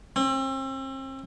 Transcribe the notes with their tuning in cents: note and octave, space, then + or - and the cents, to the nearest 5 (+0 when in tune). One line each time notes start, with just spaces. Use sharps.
C4 +40